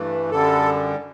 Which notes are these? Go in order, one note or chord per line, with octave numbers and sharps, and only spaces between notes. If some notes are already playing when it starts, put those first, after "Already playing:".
Already playing: G2 E3 A3
F#2 D3 G3 A4